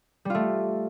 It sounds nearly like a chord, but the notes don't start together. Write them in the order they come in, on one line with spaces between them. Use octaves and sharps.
G3 F4 A3